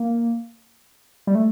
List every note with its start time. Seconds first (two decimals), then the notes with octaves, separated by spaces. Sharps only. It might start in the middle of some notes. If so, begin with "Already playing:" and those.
Already playing: A#3
1.27 G3
1.35 A3